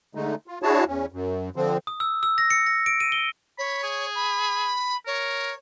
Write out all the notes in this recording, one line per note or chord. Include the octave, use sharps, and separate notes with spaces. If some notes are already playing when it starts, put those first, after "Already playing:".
D3 G#3 A3 D#4
F4
D4 E4 F#4 G#4 C#5 A5
E2 C#4
F#2
D3 F3 C4
D#6
E6
E6
A#6
C#7
A#6
D7
D#7
G7
C#5 B5
G#4
B5
A#4 C#5